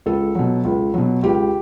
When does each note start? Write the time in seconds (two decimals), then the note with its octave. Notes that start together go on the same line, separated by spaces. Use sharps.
0.06 C#2 A4
0.35 B2 F#3
0.65 C#2
0.94 B2 F#3
1.23 C#2 G4